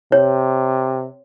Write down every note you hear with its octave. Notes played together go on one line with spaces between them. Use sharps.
C3 C#5